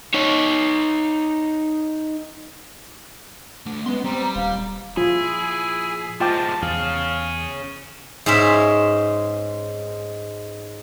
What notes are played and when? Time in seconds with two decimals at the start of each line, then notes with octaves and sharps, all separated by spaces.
0.14 D#4 C#5
3.66 A3 D4
3.86 G#3 B3 C#4 C6
4.04 G3 C4 A#5
4.36 D#1 F5
4.97 A#2 F3 E4 F4 G#4
6.20 F3 G#3 F4 G5 A5 D6
6.62 E2 C#4 G#4 F5
8.26 G#2 G#3 C#4 E5